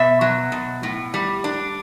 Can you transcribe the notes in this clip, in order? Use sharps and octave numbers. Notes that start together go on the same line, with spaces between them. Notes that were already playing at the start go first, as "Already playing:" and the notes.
Already playing: B2 E5
F#3
B2
A2
G3
D4